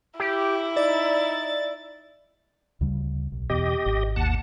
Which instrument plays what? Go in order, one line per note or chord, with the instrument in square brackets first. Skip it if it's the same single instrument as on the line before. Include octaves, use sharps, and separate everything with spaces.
[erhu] E4 [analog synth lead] G4
[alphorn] D#4 [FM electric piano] D5 [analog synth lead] A6
[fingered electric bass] D2 C#3 G3
B1
[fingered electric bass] E2 B2 [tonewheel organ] G4 D#5
[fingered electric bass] G#1
[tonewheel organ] D#2 F#5 A5